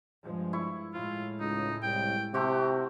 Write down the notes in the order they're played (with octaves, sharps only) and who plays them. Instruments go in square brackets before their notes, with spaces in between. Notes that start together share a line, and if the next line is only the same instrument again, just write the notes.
[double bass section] G2 F3 G#3
[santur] E4 C#6
[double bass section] A2 G#3 [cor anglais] F4
[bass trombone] C#2 [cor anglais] D#4
[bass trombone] C2 [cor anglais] G5
[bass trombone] C3 [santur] A3 C4 F#4 [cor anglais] G4